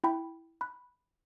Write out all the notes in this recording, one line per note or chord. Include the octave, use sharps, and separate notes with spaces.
E4 G5 B5
B5 F#6